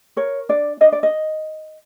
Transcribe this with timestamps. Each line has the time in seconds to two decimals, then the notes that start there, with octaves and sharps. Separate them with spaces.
0.17 A#4 C#5
0.49 D4 D5
0.81 D4 D#5
0.92 D5
1.03 D#5